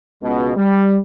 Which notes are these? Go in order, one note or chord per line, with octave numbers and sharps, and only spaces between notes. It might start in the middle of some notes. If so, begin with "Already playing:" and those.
C#2 B2
G3